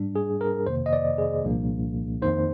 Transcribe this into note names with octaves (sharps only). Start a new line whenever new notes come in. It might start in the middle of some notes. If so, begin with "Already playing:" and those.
Already playing: G#2 G3 D4
G#4
A#4
F2 C3 D#3 A#3 C5
D#5
D5
G#4
C2 A#2 F3 A#3 D4
F2 D#3 A#3 D#4 C5